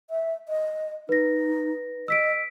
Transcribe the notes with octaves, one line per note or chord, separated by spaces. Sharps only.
E5
D#5
D#4 B4 A#6
D#5 E6 B6 D7